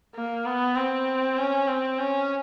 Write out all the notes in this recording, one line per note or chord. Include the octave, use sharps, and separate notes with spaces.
A#3
B3
C4
C#4
C4
C#4